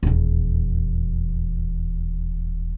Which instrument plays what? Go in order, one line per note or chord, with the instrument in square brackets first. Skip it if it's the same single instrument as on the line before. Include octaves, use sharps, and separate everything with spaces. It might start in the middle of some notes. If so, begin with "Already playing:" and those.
[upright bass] D#1 E2